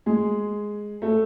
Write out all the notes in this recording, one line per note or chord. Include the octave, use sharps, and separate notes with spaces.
G#3 G#4
A3 A4